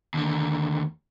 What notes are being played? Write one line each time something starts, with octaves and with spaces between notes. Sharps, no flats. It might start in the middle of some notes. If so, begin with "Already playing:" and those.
D#2 D3